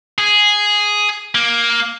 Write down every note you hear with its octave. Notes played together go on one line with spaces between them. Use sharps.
G#4
A#3